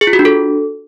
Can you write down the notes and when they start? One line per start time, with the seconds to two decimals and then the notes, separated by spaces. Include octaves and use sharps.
0.01 G#4
0.07 F4
0.13 F#4
0.19 D4
0.25 A4